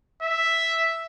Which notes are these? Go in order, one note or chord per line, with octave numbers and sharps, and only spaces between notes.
E5